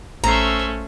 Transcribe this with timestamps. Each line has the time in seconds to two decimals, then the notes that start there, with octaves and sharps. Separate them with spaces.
0.24 A1 A3 C#4 C5 E5 A#5 C7